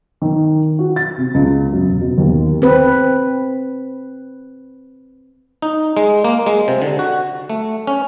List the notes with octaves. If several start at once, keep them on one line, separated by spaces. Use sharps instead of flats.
D#3
F#4
A6
C3
C#2
F#2
E1
B2
D#2
C4 B4
D#4
G#3
A#3
G#3
C3
D3
F#4
A3
C#4